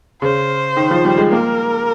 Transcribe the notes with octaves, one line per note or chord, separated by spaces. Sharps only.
C#3 C5
D#3
F3
G3
G#3
A#3 A#4